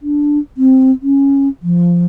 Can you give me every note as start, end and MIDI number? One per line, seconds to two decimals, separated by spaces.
0.02 0.39 62
0.57 0.92 60
1.02 1.48 61
1.63 2.06 53